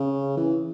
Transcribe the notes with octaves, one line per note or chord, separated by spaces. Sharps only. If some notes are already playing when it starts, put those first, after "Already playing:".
Already playing: C#3
E3